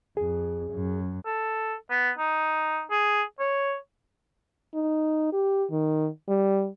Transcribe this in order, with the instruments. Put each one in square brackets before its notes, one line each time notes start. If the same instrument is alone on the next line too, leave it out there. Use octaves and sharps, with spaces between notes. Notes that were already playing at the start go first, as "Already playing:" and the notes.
[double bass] F2 [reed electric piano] G#4
[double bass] F#2
[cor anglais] A4
B3
D#4
G#4
C#5
[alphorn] D#4
G4
D#3
G3